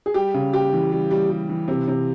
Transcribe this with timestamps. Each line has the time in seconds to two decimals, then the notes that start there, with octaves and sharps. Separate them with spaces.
0.06 G#4
0.14 G3 G4
0.34 C#3
0.53 G3 G4
0.73 E3
0.92 G3
1.11 G3
1.30 G3
1.49 E3
1.68 C3
1.88 C3